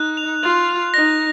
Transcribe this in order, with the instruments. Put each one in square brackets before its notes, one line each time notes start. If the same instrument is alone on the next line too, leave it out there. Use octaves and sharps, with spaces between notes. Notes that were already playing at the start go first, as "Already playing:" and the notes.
Already playing: [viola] D#4 [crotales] F#6
[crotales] F7
[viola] F4 [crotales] F7
[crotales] F7
[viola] D#4 [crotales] A#6